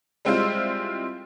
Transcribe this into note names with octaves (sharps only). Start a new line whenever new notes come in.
G3 G#3 C4 E4 F4 C5